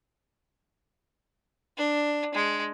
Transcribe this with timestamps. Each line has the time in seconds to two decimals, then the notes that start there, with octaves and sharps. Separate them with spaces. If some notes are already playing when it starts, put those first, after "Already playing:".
1.78 D4
2.34 G#3